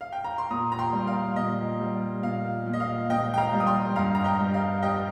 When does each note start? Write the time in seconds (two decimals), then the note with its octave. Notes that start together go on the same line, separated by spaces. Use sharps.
0.01 F5
0.12 G5
0.24 A#5
0.38 C6
0.50 A#2 A#5 D#6
0.72 A#5
0.79 G5 C6
0.93 G3
1.07 F5
1.36 A#2 D#5
1.79 G3
2.23 A#2 F5
2.66 A#2
2.73 D#5
2.80 F5
3.10 A#2 D#5 G5
3.34 G5
3.38 F5 A#5
3.53 G3
3.60 D#6
3.67 G5 C6
3.96 G2 F5 A#5
4.15 A#5
4.24 D#5 G5
4.39 G3
4.54 F5
4.82 G3 D#5 G5